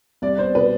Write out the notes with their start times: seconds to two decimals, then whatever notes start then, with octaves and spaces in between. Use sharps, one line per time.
0.22 C2 D5
0.38 B3 C5
0.55 B2 B4